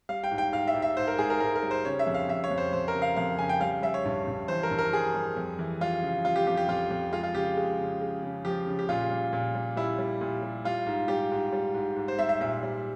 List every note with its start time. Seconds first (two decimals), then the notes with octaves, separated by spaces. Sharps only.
0.09 G3 F5
0.24 G5
0.31 G#2
0.38 G5
0.52 G#2 F5
0.67 E5
0.74 G#2
0.82 E5
0.97 G#2 C5
1.08 A#4
1.19 G#2 G#4
1.30 A#4
1.40 G#2 A#4
1.56 A#4
1.63 G3
1.71 C5
1.85 C#3 C#5
1.99 E5
2.07 F2
2.14 F5
2.29 F2 E5
2.44 C#5
2.51 F2
2.58 C5
2.73 F2 C5
2.88 A#4
2.95 C#3
3.02 F5
3.16 F2 F5
3.39 C#3 G#5
3.49 G5
3.61 G3 F5
3.83 G3 E5
3.94 C#5
4.05 G2
4.27 G2
4.48 E3 C5
4.63 A#4
4.71 G2
4.79 A#4
4.93 G3 G#4
5.14 G3
5.36 F2
5.59 E3
5.81 G3 F4
6.02 C#3
6.25 G3 F4
6.36 G4
6.47 F2 G4
6.57 G4
6.68 F2 F4
6.91 F2
7.13 G#3 F4
7.23 F4
7.35 C#3 G4
7.57 G#3
7.79 C#3
8.01 G#3
8.23 C#3
8.45 F3 G4
8.67 C#3
8.79 G4
8.89 A#2 F4
9.11 G3
9.33 A#2
9.55 G3
9.77 G3 E4
9.99 G3
10.21 A#2
10.43 G3
10.65 G3 F4
10.87 G#2
11.08 G3 G4
11.31 G#2
11.53 G3
11.74 G#2
11.96 G#2
12.08 C5
12.19 G3 E5
12.29 E5
12.40 A#2 E5
12.63 G3